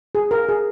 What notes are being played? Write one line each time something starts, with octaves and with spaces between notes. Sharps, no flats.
G#4
A#4
G#4